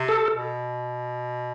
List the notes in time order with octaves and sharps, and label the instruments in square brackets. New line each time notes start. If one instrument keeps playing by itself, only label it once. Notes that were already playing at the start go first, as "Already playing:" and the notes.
Already playing: [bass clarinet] C3
[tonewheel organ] A4
[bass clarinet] B2